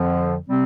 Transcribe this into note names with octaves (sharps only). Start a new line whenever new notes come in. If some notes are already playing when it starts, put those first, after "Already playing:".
Already playing: F2 D3 F3
C3 G3 C4